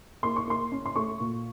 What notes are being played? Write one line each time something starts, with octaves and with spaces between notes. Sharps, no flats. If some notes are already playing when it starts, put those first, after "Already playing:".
A#3 C6
C#6
A#3 C6
C#4
C6
A3 C#6
A#2